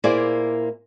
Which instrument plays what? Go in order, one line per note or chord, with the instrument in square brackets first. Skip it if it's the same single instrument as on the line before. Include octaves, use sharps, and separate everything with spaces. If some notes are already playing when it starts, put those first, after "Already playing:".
[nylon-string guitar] A#2 A#3 E4 G#4 C5 D5